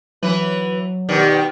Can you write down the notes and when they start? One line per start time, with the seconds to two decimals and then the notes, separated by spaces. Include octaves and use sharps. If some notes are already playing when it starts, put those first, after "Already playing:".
0.23 E3 F#3 B4
1.09 B2 D#3 G3